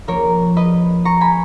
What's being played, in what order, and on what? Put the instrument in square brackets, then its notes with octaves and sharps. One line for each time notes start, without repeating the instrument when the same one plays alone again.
[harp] F3 A#3 C#4 A#4 C#5
B4 D#5
A#5 C#6
G#5 B5